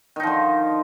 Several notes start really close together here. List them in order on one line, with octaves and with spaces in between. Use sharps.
D#3 D#4 F3 D3